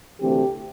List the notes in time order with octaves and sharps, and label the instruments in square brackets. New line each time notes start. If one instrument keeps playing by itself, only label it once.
[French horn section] D2 C3 E3 A3 C4 G4